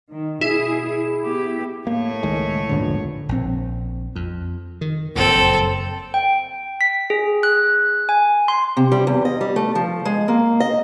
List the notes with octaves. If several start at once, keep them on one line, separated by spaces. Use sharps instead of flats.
D#3
B2 E4 G#4
B3 G4
A2 A#3 C#5
C#2 D#3 G#3
D#1 A#1 E2 G#2 D3
A#1 C4
F2
D#3
F#1 F2 A#2 C4 A4
G5
B6
G#4
F#6
G#5
C6
C3
G3
E2
D#5
G3
A3
F3
G#3
A#3
D#5